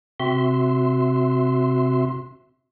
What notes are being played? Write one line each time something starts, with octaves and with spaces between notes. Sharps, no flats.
C3 C4 F#4 E5 C6